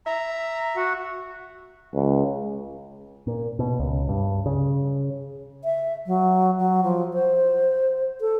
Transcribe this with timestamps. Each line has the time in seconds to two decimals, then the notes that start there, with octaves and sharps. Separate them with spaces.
0.07 E5 A#5
0.77 F#4 F#5
1.94 C#2
3.27 A#2
3.59 B2
3.79 C#2
4.09 G2
4.46 C#3
5.64 E5
6.07 F#3
6.58 F#3
6.84 F3
7.13 C5
8.21 A4